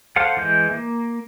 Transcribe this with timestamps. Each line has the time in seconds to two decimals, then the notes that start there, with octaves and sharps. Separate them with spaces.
0.16 A4 C5 F5 F#5
0.37 E3 G#3 G6
0.71 A#3